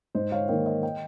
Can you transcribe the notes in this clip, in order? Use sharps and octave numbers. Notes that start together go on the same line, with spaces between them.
G#2 C5 D#5
C#5 F5
D#3 A#3 D#5 G5
D#5 G5
D#5 G5